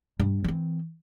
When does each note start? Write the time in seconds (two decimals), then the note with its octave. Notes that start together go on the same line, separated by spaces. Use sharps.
0.20 G2
0.44 E3 C4